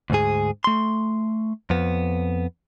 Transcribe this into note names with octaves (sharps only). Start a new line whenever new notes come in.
D2 G#2 G#4
A3 C6
F2 B3